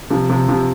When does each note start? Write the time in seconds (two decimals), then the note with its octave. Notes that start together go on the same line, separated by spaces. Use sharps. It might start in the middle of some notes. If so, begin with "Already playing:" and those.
0.10 C3 F3
0.29 C3 F3
0.48 C3 F3